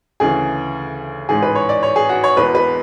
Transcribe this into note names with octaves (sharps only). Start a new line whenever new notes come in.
D2 C#3 E3 G#4
A1 G#2 E3 G#4
B4
C#5
D5
C#5
G#4
F#4
C#5
E1 E2 B2 B4
B4